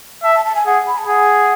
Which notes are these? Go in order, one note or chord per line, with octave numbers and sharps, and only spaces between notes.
E5 A5
A5
A5
G#5
G#4 F#5
B5
A5
G#4 F#5